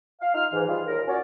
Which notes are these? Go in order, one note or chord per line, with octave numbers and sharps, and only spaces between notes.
F5
D#4 F4 F6
G#2 E3
G3 F4 G#4
D#2 A#2 A#4
C#4 F#4 C#5 D5